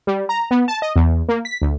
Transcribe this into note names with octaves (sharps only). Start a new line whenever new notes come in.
G3
A#5
B3
A5
D#5
E2
A#3
B6
D2